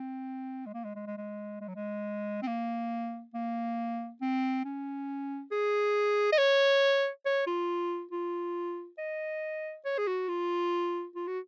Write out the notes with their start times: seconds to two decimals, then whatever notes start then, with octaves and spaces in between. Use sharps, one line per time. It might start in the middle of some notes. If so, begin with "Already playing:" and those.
Already playing: C4
0.66 G#3
0.74 A#3
0.85 G#3
0.95 G#3
1.07 G#3
1.17 G#3
1.61 G#3
1.68 F#3
1.75 G#3
2.42 C4
2.47 A#3
3.34 A#3
4.22 C4
4.65 C#4
5.51 G#4
6.32 D#5
6.38 C#5
7.25 C#5
7.47 F4
8.11 F4
8.98 D#5
9.85 C#5
9.98 G#4
10.07 F#4
10.29 F4
11.15 F4
11.28 F#4